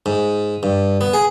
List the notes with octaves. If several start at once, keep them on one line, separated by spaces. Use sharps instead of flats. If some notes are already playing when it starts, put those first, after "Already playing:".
G#2
G2
B3
G#4